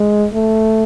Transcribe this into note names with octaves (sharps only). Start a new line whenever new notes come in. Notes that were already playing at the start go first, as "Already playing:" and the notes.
Already playing: G#3
A3